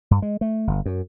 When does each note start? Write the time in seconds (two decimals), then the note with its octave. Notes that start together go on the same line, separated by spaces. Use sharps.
0.11 G2
0.22 G#3
0.41 A3
0.67 G1
0.86 F#2